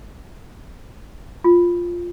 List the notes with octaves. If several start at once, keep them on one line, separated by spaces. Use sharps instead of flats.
F4